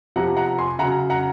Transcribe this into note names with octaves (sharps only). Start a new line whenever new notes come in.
C3 F3 F#5 A#5
F#5 A#5
G#5 C6
C#3 F#3 F#5 A#5
F#5 A#5